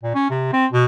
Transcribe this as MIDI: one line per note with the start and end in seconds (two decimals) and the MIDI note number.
0.03 0.14 46
0.14 0.29 61
0.30 0.51 48
0.53 0.66 60
0.72 0.85 47